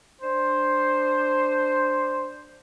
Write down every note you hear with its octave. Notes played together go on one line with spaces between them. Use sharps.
D4 C5